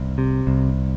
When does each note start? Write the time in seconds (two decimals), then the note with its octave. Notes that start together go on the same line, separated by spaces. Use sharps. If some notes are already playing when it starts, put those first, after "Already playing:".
Already playing: C2
0.18 C3
0.47 C2